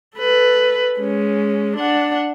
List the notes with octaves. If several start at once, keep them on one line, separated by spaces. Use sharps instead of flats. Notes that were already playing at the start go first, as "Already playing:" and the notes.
A4 B4
G#3 C#4
D4 F#5